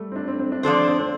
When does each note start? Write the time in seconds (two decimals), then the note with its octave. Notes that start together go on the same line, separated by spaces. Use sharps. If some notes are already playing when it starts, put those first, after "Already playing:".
Already playing: G3 A3
0.12 C4
0.16 D4
0.28 C4
0.39 C4
0.52 D4
0.63 F3 C4 D4 A4 C5
0.76 A3
0.88 C4
0.99 C4